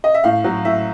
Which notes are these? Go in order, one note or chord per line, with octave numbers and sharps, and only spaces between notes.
D#5
E5
A2 F5
F#3
A2 E5